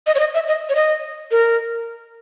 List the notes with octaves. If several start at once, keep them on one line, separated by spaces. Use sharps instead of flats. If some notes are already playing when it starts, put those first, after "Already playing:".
D#5
C#5
D#5
E5
D#5
C#5
D#5
A#4